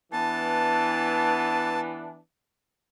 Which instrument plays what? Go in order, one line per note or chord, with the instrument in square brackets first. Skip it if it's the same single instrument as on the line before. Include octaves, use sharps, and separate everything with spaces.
[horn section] E3 B3 D4 [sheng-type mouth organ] A5